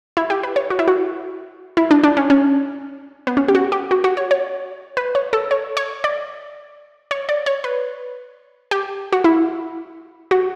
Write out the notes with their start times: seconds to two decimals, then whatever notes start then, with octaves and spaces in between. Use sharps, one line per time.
0.17 E4
0.30 G4
0.43 B4
0.56 C#5
0.70 F#4
0.79 E4
0.88 F#4
1.77 E4
1.91 D4
2.04 D4
2.17 C#4
2.30 C#4
3.27 B3
3.37 C#4
3.48 G4
3.55 F#4
3.72 G4
3.91 F#4
4.04 F#4
4.17 C#5
4.31 C#5
4.97 B4
5.15 C#5
5.33 A4
5.51 C#5
5.77 C#5
6.04 D5
7.11 C#5
7.29 D5
7.46 C#5
7.64 B4
8.71 G4
9.13 F#4
9.24 E4
10.31 F#4